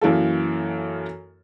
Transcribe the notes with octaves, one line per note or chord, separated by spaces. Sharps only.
F#2 E3 A#3 A4